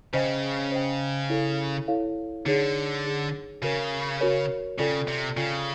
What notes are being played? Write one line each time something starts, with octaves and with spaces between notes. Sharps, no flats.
C#3 C5 D#5 G5
C5 D#5 G5
E4 A4 C#5 F5
E4 A4 C#5 F5
D3 D#4 G#4 C#5
D#4 G#4 C#5
C#3 F#4 A#4 C#5
F#4 A#4 C#5
C#3 F4 A4 D5 G5
C3
C#3 F4 A4 D5 G5